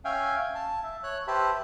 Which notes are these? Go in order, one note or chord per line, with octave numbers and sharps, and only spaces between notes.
C#4 E5 F5 G5 G#5
A5
E5
C#5 F#6
G4 B4 C5 E5 A5 B5